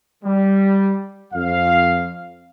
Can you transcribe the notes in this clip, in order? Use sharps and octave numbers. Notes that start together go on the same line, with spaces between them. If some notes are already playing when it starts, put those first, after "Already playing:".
G3
F2 F5